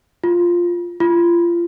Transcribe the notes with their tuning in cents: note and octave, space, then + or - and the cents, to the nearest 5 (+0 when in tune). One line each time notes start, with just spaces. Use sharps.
F4 +0
F4 -30